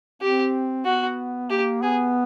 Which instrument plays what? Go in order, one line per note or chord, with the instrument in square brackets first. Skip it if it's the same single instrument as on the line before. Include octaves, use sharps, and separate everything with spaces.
[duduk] C4 [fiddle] G4
[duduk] B3 [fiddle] F#4
[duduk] A#3 [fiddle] G4
[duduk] B3 [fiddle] G#4